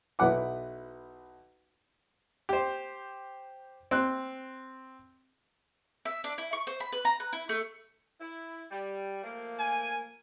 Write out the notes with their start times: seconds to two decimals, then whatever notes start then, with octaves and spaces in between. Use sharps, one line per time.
0.19 B1 E4 B4 F#5 D6
2.49 G4 C5
3.91 C4 F#6
6.05 E5
6.24 D4
6.38 E4
6.53 C#6
6.67 C5
6.80 B5
6.92 B4
7.05 A#5
7.20 B4
7.33 E4
7.49 A3
8.20 E4
8.71 G3
9.23 F3 A3 A#3
9.59 G#5